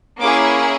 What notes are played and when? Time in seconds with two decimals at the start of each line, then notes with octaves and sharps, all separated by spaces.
0.20 A#3 C#4 E4 G#4 D6